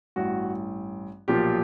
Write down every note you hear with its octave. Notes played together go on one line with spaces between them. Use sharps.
A1 G2 E3 F#4
B1 A#2 F3 G4